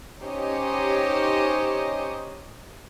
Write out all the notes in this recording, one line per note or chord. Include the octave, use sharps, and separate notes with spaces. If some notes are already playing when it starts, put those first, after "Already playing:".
C#4 D#4 G4 C5 C#5 D#5